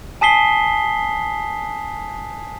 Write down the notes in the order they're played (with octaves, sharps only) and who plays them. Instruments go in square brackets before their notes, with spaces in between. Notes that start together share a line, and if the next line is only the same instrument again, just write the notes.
[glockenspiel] G#5 A5 D#6 B6 C7 G7